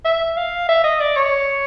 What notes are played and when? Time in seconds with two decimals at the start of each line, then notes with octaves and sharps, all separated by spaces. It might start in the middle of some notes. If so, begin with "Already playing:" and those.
0.05 E5
0.37 F5
0.69 E5
0.84 D#5
1.00 D5
1.16 C#5